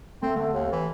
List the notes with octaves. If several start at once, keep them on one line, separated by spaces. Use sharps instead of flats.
A3 C4
D3 A3
D#2
E3